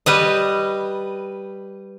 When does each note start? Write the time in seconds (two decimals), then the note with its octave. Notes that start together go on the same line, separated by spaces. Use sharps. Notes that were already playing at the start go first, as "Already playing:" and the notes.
0.06 G3 B4 D#5